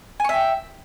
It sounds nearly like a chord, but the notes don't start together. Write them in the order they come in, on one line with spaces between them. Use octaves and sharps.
G#5 C#6 E5 G5